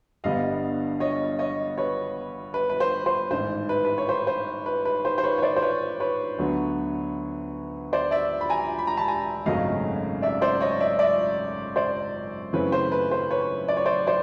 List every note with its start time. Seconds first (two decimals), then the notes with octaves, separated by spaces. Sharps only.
0.24 G1 G2 D3 G3 B3 D#5 F5
1.00 C#5 D#5
1.39 C#5 D#5
1.78 B4 C#5
2.54 B4
2.69 B4
2.80 C5
3.06 C5
3.31 A1 G#2 D#3 C5
3.69 B4
3.85 B4
3.98 C#5
4.09 C5
4.27 C5
4.66 B4
4.85 B4
5.05 C5
5.18 C5
5.24 B4 C#5
5.38 C#5
5.42 C5 D5
5.56 C5
5.62 B4 C#5
6.00 B4 C#5
6.38 D2 D3 F#3 B3
7.93 C5 D5
8.11 D5 E5
8.41 B5
8.50 G#5 A#5
8.79 B5
8.87 A#5
8.97 A5 B5
9.08 G#5 A#5
9.46 G#1 F#2 C#3 F#3 A3 D#5 F5
10.22 D5 E5
10.41 C5 D5
10.61 C#5 D#5
10.80 D5 E5
10.99 D5 E5
11.76 C5 D5
12.53 F#2 C#3 E3 A3 C4 B4 C#5
12.72 C5
12.92 B4
13.11 C5
13.31 B4 C#5
13.68 D5
13.77 C#5
13.86 C5 D5
14.07 C5 D5